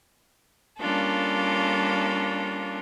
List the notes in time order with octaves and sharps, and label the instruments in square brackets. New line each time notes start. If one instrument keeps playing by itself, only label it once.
[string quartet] G3 A#3 C#4 D4 F4 A4